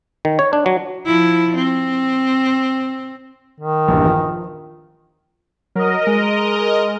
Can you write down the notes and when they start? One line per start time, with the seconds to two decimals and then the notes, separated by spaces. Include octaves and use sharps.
0.25 D#3
0.39 C#5
0.53 D4
0.66 F#3
1.06 F3 E4
1.56 C4
3.60 D#3
3.88 A#1 E2 G2
4.05 F3
5.75 F#3 A#4 D#5
6.07 G#3